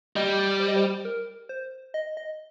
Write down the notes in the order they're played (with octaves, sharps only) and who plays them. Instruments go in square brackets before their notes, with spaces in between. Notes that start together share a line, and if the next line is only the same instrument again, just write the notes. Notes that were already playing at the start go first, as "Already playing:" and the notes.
[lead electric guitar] G3 [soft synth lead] D#5
[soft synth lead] C5
D#5
C5
A#4
C5
D#5
D#5